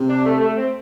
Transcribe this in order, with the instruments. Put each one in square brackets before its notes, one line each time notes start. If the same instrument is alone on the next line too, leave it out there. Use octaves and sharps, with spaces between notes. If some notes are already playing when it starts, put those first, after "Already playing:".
Already playing: [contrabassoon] C3
[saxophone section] D4
A3
A3
C4